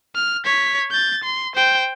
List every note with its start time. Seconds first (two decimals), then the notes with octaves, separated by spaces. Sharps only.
0.15 F6
0.45 C#5 B6
0.91 G6 A6
1.24 C6
1.55 C5 G5